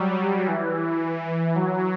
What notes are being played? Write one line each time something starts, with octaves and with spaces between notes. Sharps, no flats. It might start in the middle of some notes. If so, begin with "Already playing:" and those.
Already playing: F#3 G3
E3
F#3